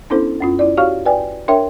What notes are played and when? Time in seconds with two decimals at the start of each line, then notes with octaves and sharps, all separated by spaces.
0.10 B3 C#4 D4 E4 A4 C5
0.40 F#2 C#4 F4
0.59 E4 D5
0.77 F#4 G4 C#5 F5 C#6 F6
1.06 B4 D5 G5 G#5
1.48 D4 A#4 C#5 E5 G5